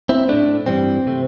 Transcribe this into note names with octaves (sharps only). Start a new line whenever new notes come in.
C4 E4
A2 A3 D4
G2 E3 G3 C4
C3 A3